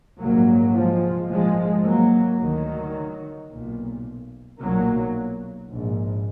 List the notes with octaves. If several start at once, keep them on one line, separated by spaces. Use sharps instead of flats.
A#1 G#2 F#3 A#3
F3 G#3
A#1 G#2 F3 G#3
F#3 A#3
D2 D#3 F#3
B1 A#2
B1 A#2 F#3 A#3
A#1 G#2